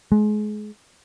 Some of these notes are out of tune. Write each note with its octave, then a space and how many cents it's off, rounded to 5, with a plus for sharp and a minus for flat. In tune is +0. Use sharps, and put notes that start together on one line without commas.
G#3 +30